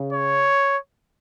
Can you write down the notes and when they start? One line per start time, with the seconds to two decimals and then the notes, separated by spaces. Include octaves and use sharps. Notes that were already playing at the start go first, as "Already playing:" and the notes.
Already playing: C#3
0.13 C#5